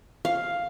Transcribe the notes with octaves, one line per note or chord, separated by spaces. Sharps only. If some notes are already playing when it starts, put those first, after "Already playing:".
F5